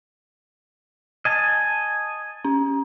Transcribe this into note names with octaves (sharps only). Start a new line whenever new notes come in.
D#5 G#5 A5 G#6
C#4